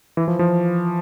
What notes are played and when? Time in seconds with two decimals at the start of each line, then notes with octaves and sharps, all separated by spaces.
0.17 E3
0.28 F3
0.39 F3